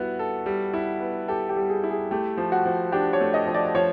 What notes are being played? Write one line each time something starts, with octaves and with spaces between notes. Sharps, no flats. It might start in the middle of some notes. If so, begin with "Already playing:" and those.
Already playing: G3 B3 E4 F#4
A4
G3
E4
B3
G4 A4
G4
G3
G#4
E4
G#4
A3 G4
F3
F#4
F3
D4 G4
C#5
A3
D#5
F3
D5
F3 C#5